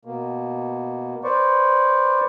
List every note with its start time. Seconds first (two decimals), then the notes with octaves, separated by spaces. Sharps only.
0.05 B2 A#3
1.24 B4 C5 D5 C#6